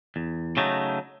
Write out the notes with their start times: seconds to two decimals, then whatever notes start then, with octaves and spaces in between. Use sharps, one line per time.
0.16 E2
0.57 C#3 F#3 A3 D#4